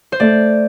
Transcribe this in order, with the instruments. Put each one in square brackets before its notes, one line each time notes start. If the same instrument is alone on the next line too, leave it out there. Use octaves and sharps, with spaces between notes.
[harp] C5
[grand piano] A3 [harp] D5